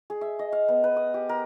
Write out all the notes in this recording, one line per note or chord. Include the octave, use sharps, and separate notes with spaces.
G#4
E5
D#5
F5
B3
B4
D#6
G4
A#4